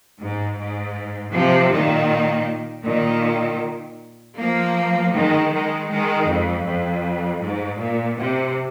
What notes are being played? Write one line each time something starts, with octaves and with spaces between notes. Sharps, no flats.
G#2
G#2
C3 F3
A#2 D#3
A#2 D#3
F3 A#3
D#3 G#3
D#3 G#3
D#3 G#3
F2
F2
G#2
A#2
C3